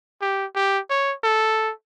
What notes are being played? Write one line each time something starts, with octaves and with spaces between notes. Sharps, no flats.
G4
G4
C#5
A4